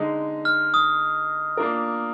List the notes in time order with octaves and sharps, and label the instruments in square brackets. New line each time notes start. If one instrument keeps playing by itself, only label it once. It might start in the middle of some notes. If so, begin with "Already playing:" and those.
Already playing: [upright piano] D3 G#3 D#4
[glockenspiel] F6
D#6
[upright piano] A#3 D4 F4 A#4